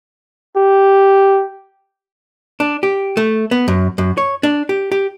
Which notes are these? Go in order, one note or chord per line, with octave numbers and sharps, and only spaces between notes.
G4
D4
G4
A3
B3
F#2
F#2
C#5
D4
G4
G4